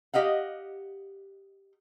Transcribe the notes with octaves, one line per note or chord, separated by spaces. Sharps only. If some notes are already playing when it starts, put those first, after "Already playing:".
G4 D#5 F5 F#5